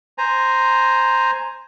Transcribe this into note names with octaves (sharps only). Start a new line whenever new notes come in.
C5 G#5 A#5